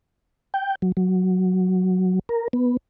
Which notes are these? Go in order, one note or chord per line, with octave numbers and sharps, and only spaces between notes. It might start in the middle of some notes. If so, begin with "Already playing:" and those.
G5
F#3
F#3
A#4
B3